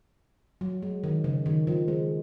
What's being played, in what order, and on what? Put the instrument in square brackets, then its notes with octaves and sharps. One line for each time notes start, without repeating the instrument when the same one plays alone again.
[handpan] F#3
G#3
D#3
C#3
D#3
F3
G#3